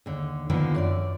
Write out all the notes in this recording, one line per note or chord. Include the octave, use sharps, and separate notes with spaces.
D#2 D3
D3 D#3 F3 A#3 B3
F#2 A#4 D5